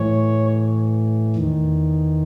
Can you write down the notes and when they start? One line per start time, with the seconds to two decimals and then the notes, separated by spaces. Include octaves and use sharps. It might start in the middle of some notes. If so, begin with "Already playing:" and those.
Already playing: A2 E3 C#5
1.36 E2 D#3